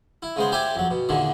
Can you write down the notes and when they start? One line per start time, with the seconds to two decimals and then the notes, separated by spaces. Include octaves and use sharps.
0.22 E4
0.36 C#3 G#3 B3 C5
0.52 E4 G4 C5 D5 E5 G#5
0.76 F2 F#3
0.91 B2
1.09 E2 A#2 D3 D#3